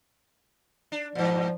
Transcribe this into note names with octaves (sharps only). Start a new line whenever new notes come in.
D4
G2 A#2 F3